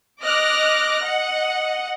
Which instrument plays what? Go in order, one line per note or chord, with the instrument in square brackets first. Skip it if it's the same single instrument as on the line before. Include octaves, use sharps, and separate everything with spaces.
[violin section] D#5 D6 F6 F#6 A#6
D#5 F#5